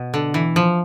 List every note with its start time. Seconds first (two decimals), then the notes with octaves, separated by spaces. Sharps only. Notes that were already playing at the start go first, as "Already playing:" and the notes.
Already playing: B2
0.14 D3
0.34 E3
0.56 F3